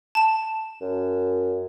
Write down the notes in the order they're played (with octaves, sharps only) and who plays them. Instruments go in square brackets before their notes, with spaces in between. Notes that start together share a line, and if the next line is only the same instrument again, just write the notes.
[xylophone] A5 E7
[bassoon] F#2